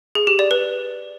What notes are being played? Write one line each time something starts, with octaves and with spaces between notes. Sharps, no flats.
G#4
G4
D5
B4